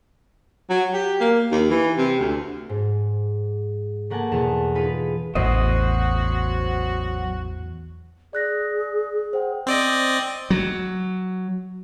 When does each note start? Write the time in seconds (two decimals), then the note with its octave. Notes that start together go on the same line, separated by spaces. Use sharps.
0.70 F#3
0.94 G4
1.20 A#3
1.52 D#2
1.71 E3
1.98 C3
2.19 D2
2.69 G#2
4.10 A3 A#3 F#5 G#5 A5
4.32 E2 B2 A5 E7
4.75 G#3 D#4 F4 B4
5.35 A1 E2 F#3 F#4 C5 D#5
8.33 G#4 D5 F#6 A#6
9.33 C5 F#5 G5
9.67 C4 D5 D#5
10.50 F#3